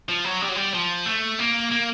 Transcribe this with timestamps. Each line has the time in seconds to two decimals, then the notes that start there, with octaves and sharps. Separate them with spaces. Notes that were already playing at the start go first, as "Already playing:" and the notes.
0.09 F3
0.25 F#3
0.42 G3
0.49 F#3
0.56 G3
0.74 F3
1.06 A3
1.39 A#3
1.71 A#3